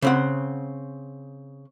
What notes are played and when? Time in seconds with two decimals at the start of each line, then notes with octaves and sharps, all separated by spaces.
0.02 C#3 C4 F#5